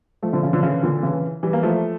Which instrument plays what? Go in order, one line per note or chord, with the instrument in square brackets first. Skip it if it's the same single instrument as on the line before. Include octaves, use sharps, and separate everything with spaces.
[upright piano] F3 A3
D3 F3
C#3 E3
D3 F3
C#3 E3
A#2 D3
C#3 E3
E3 G3
A#3
F3 A3